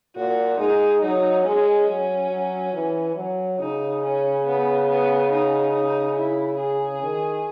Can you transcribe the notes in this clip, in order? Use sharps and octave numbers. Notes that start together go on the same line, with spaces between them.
A#2 F#4
G#3 D#4
F#3 D#4
G#3 C#4
F#3
F#3
E3
F#3
C#3 D#4
C#4
B3
B3
D#4
D#4
E4
G#4
D#3